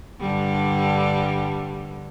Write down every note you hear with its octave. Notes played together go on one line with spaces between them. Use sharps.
G2 D3 G3